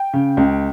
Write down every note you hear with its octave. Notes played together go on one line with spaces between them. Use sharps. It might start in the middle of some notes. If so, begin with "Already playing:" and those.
Already playing: G5
C#3
C#2